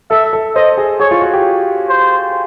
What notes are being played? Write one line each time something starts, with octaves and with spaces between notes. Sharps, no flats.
A4 E5
A4
C5 D#5
G#4
G#4 C#5
F4
F#4
G4
C5